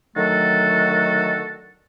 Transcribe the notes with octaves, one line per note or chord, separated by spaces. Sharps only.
D3 D#3 F#3 A3 F#4 A4